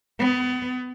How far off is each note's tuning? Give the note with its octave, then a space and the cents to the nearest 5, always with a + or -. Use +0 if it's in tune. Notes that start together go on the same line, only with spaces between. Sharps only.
B3 +30